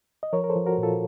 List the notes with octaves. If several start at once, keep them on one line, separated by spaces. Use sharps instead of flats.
D#5
F3 A#4 C#5
A#4
A4 C5
F3
F#4 A#4
A#2
F4 A4